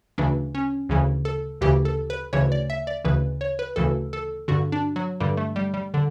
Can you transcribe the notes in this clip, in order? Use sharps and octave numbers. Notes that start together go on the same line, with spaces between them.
D2 C#3 E3 D4
C#4
D2 C#3 E3
A4
D2 C#3 E3 G4
A4
B4
D2 C#3 E3 C#5
D5
E5
D5
D2 C#3 E3 B4
C#5
B4
D2 C#3 E3 A4
A4
G2 D3 F#4
D4
F#3
G2 D3 G3
A3
G3
G3
D3